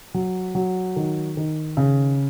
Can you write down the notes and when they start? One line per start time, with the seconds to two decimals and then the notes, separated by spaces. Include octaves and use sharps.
0.14 F#3
0.55 F#3
0.96 D#3
1.37 D#3
1.77 C#3